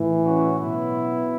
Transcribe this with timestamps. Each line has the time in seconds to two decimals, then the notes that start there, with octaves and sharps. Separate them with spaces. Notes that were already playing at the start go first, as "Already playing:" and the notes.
Already playing: A2 E3
0.24 C#4 F#4
0.58 B2 F#3 B3 E4